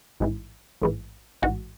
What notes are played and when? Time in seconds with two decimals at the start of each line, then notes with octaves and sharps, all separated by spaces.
0.20 A1 G#2 E3
0.82 A1 G#2 E3
1.42 A1 G#2 E3 F#4